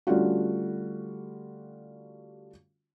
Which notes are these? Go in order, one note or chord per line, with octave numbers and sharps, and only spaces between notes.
D3 G3 A3 C#4 F4 F#4